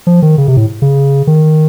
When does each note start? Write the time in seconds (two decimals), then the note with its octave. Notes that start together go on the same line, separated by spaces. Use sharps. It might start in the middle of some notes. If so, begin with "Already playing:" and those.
0.07 F3
0.22 D#3
0.38 C#3
0.48 C3
0.57 A2
0.82 C#3
1.27 D#3